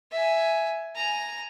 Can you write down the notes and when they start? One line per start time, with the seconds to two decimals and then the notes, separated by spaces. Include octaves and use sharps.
0.12 E5 G#5
0.96 G#5 A#5